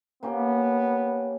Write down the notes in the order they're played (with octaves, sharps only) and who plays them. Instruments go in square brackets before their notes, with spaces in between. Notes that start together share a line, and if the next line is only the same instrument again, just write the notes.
[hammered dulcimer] A#3 C#4 G4 [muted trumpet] B3